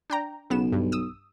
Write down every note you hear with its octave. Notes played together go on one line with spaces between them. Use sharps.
D4 G5 A#5
B1 C#3 B3 E7
G2
D#6 E6